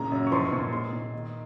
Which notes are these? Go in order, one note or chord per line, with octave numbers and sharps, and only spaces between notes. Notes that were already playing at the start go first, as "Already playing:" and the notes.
Already playing: A#2 C#3 A#5
F#2
C#6
F3 C6
C#6
A#2
C6
G#3 C6
A#2
D#3